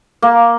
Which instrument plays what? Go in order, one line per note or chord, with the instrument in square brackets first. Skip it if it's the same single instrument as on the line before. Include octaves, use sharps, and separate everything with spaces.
[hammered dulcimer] A#3